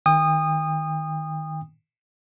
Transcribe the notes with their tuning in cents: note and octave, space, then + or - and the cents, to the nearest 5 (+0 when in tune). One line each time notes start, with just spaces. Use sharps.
D#3 +0 G5 +35 D#6 -15